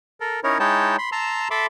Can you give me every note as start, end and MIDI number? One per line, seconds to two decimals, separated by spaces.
0.20 0.40 69
0.20 0.40 70
0.44 0.58 61
0.44 0.58 63
0.44 0.58 64
0.44 0.58 70
0.44 0.58 73
0.60 0.96 56
0.60 0.96 63
0.60 0.96 64
0.60 0.96 73
0.60 0.96 79
0.60 0.96 81
0.98 1.10 83
0.98 1.10 84
1.12 1.48 81
1.12 1.48 82
1.12 1.48 84
1.12 1.48 88
1.51 1.66 69
1.51 1.66 76
1.51 1.66 83
1.51 1.66 84
1.51 1.66 86